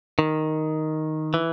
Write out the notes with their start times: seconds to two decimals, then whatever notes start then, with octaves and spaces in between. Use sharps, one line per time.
0.19 D#3
1.34 E3